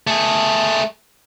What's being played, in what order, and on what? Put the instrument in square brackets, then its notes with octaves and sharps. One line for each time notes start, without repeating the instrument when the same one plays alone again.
[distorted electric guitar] A3 G#4